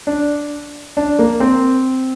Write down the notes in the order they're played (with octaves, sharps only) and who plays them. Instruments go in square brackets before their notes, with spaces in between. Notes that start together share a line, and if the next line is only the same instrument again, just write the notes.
[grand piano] D4
D4
A#3
C4